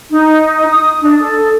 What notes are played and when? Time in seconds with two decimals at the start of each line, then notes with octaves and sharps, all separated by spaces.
0.10 D#4
0.66 D#6
1.01 D4
1.19 A4